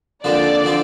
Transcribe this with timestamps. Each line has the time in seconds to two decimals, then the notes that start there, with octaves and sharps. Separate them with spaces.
0.24 D#2 D3 F3 C4 F4 D5
0.64 D3 F3 C4 F4